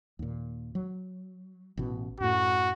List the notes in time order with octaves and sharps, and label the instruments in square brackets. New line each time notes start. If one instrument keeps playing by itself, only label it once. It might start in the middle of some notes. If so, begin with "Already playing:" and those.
[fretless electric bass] D#2 A#2
F#3
A1 B2
[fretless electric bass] F#2 A2 [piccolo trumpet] F#4